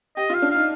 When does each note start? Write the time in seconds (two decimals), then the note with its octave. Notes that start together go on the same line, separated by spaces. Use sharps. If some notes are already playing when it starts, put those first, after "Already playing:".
0.17 G4 D#5
0.30 F4
0.34 F5
0.42 D4
0.51 D#4 F5